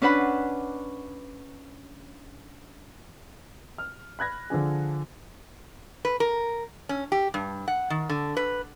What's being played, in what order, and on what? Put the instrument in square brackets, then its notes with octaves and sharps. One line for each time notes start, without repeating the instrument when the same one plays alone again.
[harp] C#4 D4 B4 F#5 B5
[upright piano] F6
B5 F#6 G#6 A#6
D3 F3 D4 G#4
[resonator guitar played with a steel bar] B4
A#4
C#4
G4
G2
F#5
D#3
D3
B4